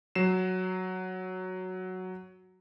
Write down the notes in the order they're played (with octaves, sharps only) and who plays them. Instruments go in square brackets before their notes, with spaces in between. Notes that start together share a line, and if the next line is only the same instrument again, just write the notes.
[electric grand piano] F#3 C7 E7